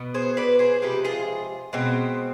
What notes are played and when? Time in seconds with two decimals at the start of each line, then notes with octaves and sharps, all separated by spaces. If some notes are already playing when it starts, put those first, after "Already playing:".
Already playing: B2 B3
0.14 G#4 C5
0.37 B4 D5
0.59 G#4 C5
0.82 C3 F3 G#3 G4 B4
1.05 F4 G#4
1.73 B2 G#3 C4